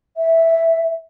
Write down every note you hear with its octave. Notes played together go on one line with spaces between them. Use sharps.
E5